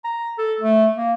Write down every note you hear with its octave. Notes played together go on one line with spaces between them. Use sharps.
A#5
A4
A3
A#3